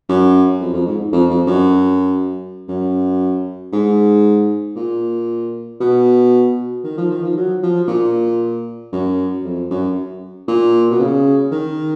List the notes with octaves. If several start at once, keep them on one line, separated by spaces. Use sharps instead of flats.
F#2
F2
F2
G#2
F2
F2
F#2
F#2
G#2
A#2
B2
D#3
F3
D#3
F3
F#3
F3
A#2
F#2
F2
F#2
A#2
B2
C#3
D#3